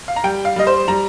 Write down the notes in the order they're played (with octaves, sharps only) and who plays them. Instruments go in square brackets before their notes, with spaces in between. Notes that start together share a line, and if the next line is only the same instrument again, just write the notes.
[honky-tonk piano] F5
A#5
G3 G5
F5
G3 D#5
C5
G3 A#5